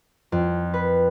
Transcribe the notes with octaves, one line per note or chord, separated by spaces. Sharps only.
F2
B4